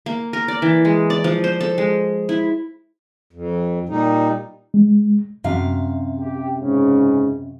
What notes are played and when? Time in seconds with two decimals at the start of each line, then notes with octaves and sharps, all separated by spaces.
0.06 A#3
0.33 A#4
0.48 D5
0.62 E3
0.85 G#3
1.10 D5
1.24 F3
1.44 C5
1.61 A4
1.78 G#3
2.29 E4
3.33 F2
3.89 A#2 G3 D#4
4.74 G#3
5.44 F#2 C3 F5
6.20 G4
6.60 G#2 C#3 C#4